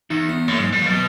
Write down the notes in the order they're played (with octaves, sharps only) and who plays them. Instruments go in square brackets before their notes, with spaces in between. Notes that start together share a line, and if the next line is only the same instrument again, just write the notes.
[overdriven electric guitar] E2 [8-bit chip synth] D#4
[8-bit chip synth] B3
[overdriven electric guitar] F#2 [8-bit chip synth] A#3
[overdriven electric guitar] G#2 [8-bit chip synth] F#3
[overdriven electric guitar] A#2 [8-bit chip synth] F#3
[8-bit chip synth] E3
[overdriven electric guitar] B2 [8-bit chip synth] F#3